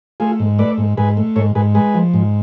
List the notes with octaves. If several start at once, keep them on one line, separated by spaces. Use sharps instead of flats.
A3 F4 G#4
G#2
A3 B4 D5
G#2
G#2 G#4 B4
A3
G#2 A4 C#5
G#2 G#4 B4
G#3 G#4 B4
F3
G#2